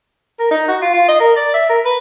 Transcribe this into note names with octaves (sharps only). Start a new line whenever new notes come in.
A#4
D#4
F#4
F4
F4
D#5
A#4
D5
E5
A#4
B4